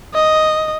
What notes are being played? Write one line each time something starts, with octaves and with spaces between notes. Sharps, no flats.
D#5